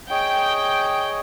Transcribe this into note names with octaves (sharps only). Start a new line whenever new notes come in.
G#4 C#5 D#5 G5